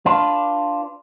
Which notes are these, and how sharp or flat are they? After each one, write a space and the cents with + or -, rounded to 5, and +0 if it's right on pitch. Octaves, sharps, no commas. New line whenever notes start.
D4 +0 F4 +0 B4 +0